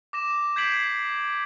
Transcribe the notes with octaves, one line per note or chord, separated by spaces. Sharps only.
D6 A#6 E7
G6 G#6 B6 C7 D7 F#7